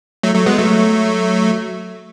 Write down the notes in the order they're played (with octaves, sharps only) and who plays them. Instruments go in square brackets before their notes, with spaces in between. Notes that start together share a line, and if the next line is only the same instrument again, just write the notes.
[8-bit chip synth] F#3 A3
F#3 A3
G#3 B3
F#3 A3